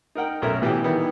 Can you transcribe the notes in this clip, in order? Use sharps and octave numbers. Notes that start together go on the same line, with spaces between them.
D#4 A#4 F#5 G5
B1 A3 B3 C#4 A#4 E5
B2 E3 E4 G4 G#4
D#3 E3 G3 B3